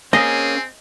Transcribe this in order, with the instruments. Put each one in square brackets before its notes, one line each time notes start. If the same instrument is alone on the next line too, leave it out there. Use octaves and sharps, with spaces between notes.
[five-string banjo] A#3 [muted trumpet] C4 [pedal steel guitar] C#4 G#4 [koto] D#5